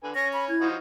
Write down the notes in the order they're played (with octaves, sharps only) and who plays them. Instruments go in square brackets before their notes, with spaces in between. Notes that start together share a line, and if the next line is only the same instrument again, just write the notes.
[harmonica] D3 B4 G#5
[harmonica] C#4 C#5 [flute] A#6
[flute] B5
[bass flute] E4 [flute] G#6
[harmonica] F3 D#4 F#4